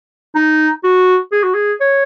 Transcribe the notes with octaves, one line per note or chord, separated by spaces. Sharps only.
D#4
F#4
G#4
F#4
G#4
C#5